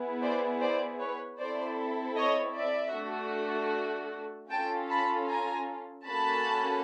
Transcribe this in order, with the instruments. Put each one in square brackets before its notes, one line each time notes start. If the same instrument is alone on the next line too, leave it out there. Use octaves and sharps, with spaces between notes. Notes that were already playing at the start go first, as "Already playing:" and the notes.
Already playing: [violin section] B3 E4 G#4
C5 D5
C5 D5
B4 C#5
C4 E4 A4 C5 D5
C#5 D#5
D5 E5
A3 D4 F#4 A4
C#4 F4 A4 G5 A5
A5 B5
G#5 A#5
A#3 C#4 F#4 A4 A5 B5